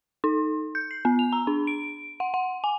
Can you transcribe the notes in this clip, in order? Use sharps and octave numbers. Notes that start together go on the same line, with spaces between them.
D#4
G6
C7
B3
F7
A#5
D4
D7
F#5
F#5
G#5